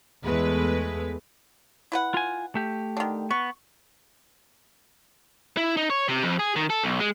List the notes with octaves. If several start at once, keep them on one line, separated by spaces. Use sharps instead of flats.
E2 G#3 A3 B4
E4 B4 F#5
F4 G#5
A3 G4
D3 D#3
B3 C#6
E4
D#4
C#5
C3
F2
G#4
D#3
A4
B1
G#3